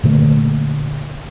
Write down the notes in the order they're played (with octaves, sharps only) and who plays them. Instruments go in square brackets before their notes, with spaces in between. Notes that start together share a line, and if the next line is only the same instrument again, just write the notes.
[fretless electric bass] A#2 D3 A3 A#3